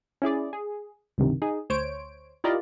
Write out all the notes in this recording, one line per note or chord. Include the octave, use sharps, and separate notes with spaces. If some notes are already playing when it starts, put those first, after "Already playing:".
C#4 E4 G#4 D5
G#4
C#2 G2 C3 D#3
D#4 G#4
D2 C5 C#5 D7
E4 F4 G4 A#4 D5 D#5